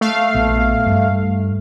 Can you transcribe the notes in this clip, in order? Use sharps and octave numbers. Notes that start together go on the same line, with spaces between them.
A3 F5
A#1 B3
G2